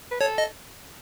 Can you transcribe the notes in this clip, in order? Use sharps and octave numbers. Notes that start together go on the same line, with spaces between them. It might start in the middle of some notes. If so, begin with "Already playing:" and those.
B4
A4 C#5
D#5